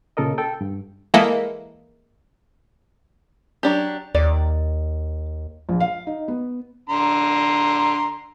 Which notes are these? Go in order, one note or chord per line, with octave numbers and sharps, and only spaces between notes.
A#2 C#3 A4 A#4 D#5
A4 G5
G2
E3 G#3 A#3 E4 A4 D#5
F#3 D4 G4
D#2 D5
A#1
F5
D#4
B3
D3 A#5 C6